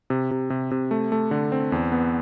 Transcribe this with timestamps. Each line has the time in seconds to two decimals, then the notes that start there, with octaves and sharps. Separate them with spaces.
0.10 C3
0.31 C3
0.50 C3
0.71 C3
0.91 A3
1.12 A3
1.31 D3
1.52 C4
1.72 E2
1.92 B3